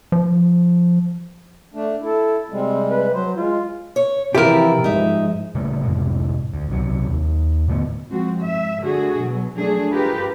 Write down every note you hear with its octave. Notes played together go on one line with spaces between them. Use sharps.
F3
A3 D4
E4 A4
C3 G3 G#3 C4
B4
F#3 C5
G#3 F4
C#5
C3 E3 F3 E4 F4 G4 A#4
G#2 F3 G#3 D#4 E5
C#3 G3 A3 A#3
F2 A2 C3 G#3
D2
C2 C3 F#3
D#2
A2 D3 A3 B3
F3 G#3 C4 F#4
G#2 E5
D3 A3 F#4 G#4
B2 F#3
F3 F#3 A3 D4 G#4
F4 G4 G#4 A#4 B4